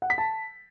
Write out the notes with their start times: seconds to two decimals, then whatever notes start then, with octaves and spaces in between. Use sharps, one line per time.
0.02 F#5
0.10 B6
0.18 A5